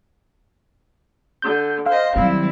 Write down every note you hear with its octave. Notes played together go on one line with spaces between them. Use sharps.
D3 G6
C5 D#5 F5
D#3 F#3 G3 C4 E4